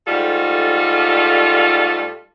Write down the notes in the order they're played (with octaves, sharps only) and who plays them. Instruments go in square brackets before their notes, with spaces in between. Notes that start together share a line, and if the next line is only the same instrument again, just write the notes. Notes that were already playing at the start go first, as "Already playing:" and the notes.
[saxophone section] G#2 G3 A3 F4 A4